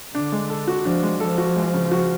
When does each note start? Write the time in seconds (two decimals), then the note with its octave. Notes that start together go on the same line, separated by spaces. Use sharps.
0.14 D3 D4
0.32 G#3
0.50 A4
0.67 F#4
0.85 F3 D4
1.03 G#3
1.20 F3 A4
1.38 F#4
1.56 G#3
1.74 C#3
1.91 F#4